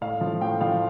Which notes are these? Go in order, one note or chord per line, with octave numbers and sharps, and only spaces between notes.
A2 F5
F3
A2 G5
F3 F5